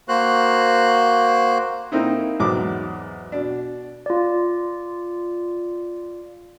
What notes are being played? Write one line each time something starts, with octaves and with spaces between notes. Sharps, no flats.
A#3 F#4 C5 F#6
A#3 C4 D#4 E4
E2 G#2 F#3 D6
B2 D4
F4 D5